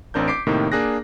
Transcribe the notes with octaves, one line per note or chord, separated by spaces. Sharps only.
A1 C4 D4 A#4 G6
D6 G6 B6 C7 D7
A2 C3 D#3 A#3 D#4
A#3 D4 G#4 F#6 A#6